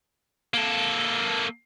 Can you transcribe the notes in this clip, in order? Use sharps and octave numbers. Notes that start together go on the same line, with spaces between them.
A#3 A4